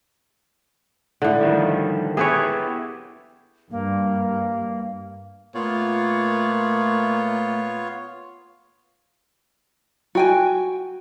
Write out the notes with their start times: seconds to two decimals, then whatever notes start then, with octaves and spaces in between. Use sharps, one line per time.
1.22 A2 D3
1.41 D#3 F3 G3
2.17 B3 E4 G4 G#4 B4 C#5
3.71 G2 A#3
5.54 A#2 A3 B3 F4 C#5
10.15 F#4 G5 G#5